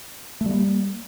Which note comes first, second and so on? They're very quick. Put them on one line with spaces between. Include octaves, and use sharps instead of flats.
A3 G3 A#3